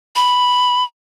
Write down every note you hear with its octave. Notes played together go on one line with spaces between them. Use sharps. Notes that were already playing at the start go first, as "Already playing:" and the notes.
B5